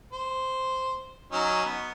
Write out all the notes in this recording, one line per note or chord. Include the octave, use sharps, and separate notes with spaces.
C5
F#3 C#4 D#4
B3